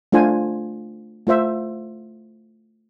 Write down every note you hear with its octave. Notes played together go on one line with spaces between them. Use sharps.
A3 D4 F4 C5 G#5
A3 F4 C5 E5